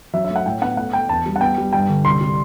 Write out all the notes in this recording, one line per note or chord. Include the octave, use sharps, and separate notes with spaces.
F#3 E5
E5
A3
F#5
A2 G5
B3 F#5
A3 F#5
A3 G5
E2 A5
G3
F#5
B3 G5
G3
G2 G5
D3
C2 C6
G3